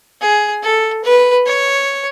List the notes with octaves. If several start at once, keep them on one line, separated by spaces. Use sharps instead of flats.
G#4
A4
B4
C#5